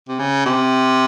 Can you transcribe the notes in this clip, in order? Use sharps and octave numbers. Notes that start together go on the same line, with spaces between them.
C3
C#3
C3